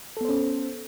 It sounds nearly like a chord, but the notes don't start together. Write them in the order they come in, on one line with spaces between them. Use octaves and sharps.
A4 B3 C5 C#4